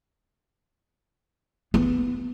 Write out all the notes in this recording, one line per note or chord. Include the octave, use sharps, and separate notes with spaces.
B3